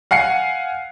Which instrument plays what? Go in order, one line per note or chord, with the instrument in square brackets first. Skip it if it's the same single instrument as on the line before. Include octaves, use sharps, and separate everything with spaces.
[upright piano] F5 F#5 G#5 C7 C#7